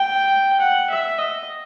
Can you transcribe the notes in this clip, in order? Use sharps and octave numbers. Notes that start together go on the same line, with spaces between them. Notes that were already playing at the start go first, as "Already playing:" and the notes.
Already playing: G5
F#5
E5
D#5